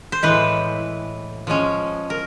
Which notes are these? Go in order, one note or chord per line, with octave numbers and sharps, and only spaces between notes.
C5
A2 E3 G#3 B4
F3 G#3 C#4
A#4